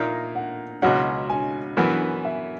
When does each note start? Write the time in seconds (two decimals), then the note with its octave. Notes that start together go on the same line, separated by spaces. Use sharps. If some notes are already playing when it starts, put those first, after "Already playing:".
Already playing: A#2 A#3 D#4 E5
0.35 F#5
0.82 C#2 B2 F#3 C#4 F#5
1.30 G#5
1.77 F#2 E3 B3 F#5
2.25 E5